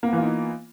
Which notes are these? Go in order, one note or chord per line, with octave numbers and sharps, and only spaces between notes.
E3 A#3 B3 D#4 F4